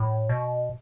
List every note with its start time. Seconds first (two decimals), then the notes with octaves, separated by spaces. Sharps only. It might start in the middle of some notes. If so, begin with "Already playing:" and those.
Already playing: A2
0.29 B2